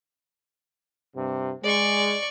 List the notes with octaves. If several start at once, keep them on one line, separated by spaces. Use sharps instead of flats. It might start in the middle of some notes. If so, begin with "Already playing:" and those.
G2 C3
G#3 D5 C#6